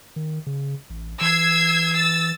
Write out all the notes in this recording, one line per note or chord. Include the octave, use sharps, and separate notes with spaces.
D#3
C#3
A1
E3 E6 G#6 C7
E6 A6